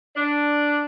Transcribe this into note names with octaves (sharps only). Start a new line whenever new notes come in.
D4